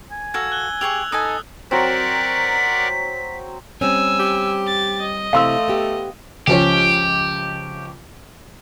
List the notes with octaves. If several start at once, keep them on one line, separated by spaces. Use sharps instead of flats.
G#5
F#4 A4 F5 E6 G#6
F#6 G7
G4 G#4 C#6 E6 F7
D#4 A4 D#5 G#5 D#6
F#3 C4 A#4 D5 F#5 B6
G3 C4 C#4 G#5 E6
G4
A6
D#5
C3 A3 C4 E4 F5 C6 E6
B3 G4
C#2 F3 C#4 G4